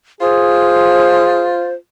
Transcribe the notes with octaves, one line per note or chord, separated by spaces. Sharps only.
F4 G#4 C5